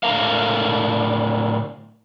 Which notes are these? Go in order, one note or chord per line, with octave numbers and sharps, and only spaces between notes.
A2 D3 A4 A#4 F5